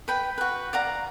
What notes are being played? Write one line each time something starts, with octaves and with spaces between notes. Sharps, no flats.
B4 G5 B5
F#4 B4
D5 F5 F#5 A#5